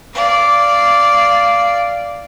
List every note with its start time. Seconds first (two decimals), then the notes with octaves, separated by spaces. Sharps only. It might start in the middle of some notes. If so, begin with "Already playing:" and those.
0.14 D5 F5